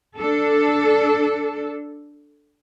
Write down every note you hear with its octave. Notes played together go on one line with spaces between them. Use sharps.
D4 A4